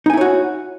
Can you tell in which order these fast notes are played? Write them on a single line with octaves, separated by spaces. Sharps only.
D#4 G#5 E4 C#5 F#4